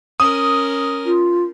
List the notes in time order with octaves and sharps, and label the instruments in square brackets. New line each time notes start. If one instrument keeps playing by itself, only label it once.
[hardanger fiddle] C#4 A#4 [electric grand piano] D#6
[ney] F4